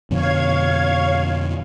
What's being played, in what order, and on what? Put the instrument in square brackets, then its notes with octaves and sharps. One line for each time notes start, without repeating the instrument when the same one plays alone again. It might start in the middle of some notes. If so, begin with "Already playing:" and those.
[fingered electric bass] F2 B2 D3 [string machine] C#5 F5 G#6